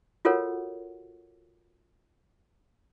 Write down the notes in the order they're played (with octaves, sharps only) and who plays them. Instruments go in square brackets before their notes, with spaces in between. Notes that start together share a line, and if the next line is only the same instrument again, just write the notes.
[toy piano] F4 F#4 A4 A#4 C#5 F#5